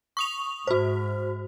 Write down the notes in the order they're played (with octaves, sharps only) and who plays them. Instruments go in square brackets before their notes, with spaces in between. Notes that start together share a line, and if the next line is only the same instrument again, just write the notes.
[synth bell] C#6 D#6 F7
[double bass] G#2 [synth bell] F#4 C5